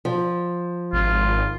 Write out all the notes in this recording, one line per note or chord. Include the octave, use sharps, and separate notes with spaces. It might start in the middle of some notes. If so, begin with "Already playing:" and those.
F3
G#1 F4